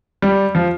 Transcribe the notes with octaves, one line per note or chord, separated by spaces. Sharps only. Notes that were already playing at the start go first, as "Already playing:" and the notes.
G3
F3